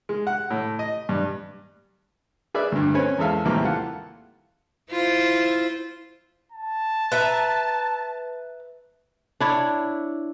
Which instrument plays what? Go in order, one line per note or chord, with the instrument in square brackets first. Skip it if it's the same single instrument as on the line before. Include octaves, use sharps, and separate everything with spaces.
[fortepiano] G#3
F#5
A2
D#5
G2
G#4 B4 D5 E5
D2 G2
C4 C#4 B4 C#5 G#5
E2 G#3 A4 E5 F5
D#2 A2 C3 E3 G3 A#3
F4 A4 F#5
[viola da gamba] E4 F4 C5
[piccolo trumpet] A5
[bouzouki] B4 E5 A#5
[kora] D4 E4 C#5